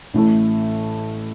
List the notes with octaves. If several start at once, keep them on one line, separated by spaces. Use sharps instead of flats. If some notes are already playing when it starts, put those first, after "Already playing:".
A1 A2 A3